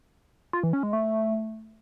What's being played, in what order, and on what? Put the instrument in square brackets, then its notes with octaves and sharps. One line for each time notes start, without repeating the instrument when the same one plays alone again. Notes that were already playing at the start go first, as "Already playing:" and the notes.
[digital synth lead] F4
E3
C#4
G#3
A3